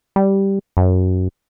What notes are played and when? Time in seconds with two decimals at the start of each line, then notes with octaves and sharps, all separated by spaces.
0.16 G3
0.77 F#2